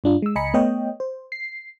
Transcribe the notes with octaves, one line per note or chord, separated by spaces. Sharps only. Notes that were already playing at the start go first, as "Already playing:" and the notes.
G2 D4 F4
G#3 E6
C#2 D#5 G#5 A#5 B5 C#7
A3 B3 C#5 D#5 G5
C5
C7